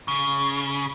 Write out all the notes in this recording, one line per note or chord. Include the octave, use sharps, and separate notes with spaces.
C#3